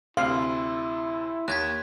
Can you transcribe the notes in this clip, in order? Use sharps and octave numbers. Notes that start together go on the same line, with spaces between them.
D2 C3 E4 F5 C6
D#2 C#5 F#6 G#6 B6